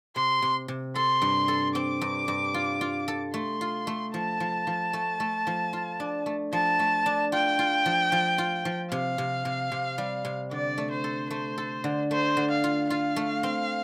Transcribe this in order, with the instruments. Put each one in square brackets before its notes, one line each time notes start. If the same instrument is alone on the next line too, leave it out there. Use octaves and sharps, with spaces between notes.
[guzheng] C3 [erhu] C6
[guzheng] C3
C3
[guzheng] A4 [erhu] C6
[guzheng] G2
A4
[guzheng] C4 [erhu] D6
[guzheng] G2
G2
F4
F4
A4
[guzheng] A3 [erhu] C6
[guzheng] F4
A3
[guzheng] F3 [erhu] A5
[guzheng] F3
F3
A3
A3
F3
F4
D4
A3
[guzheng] F3 [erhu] A5
[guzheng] A3
D4
[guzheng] F4 [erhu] G5
[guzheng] F4
F3
F3
F4
F3
[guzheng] C3 [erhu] F5
[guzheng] C3
C3
C3
G3
C3
[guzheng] D3 [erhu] D5
[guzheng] A3
[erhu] C5
[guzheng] A4
[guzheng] A3 [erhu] C5
[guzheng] A4
D3
[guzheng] A3 [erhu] C5
[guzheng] D3
[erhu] F5
[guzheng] F4
[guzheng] F4 [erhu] F5
[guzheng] A3
C4